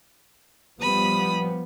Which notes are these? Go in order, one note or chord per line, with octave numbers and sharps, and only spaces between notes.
F3 G3 B3 B5 D#6